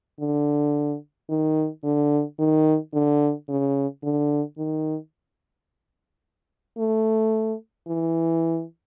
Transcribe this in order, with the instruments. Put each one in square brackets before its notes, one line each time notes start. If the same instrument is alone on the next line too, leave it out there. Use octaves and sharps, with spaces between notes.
[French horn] D3
D#3
D3
D#3
D3
C#3
D3
D#3
A3
E3